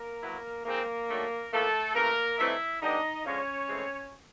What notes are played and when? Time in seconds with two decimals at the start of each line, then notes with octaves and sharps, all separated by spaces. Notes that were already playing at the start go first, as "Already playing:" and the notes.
Already playing: A#3 A#4
0.23 A2 F#3 B3 E4
0.66 G#2 F3 G#3 A#3 C4 D#4 A#4
1.09 D#3 F#3 A3 D4
1.52 A2 F3 A3 A#3 A4
1.95 C#3 E3 A3 A#3 A#4
2.38 G2 E3 A3 C4 D#4 E4 E5
2.82 D3 G3 B3 D4 D#4 D#5
3.25 D3 F3 G#3 C#4 C#5
3.69 A2 E3 G#3 C4